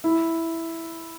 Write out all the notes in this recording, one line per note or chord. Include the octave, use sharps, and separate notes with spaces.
E4